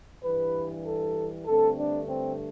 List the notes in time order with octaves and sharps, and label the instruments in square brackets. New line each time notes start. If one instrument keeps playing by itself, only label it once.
[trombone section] G2 E3 G3 B4
A4
G2 D3 A3 C4 A4
D4
C4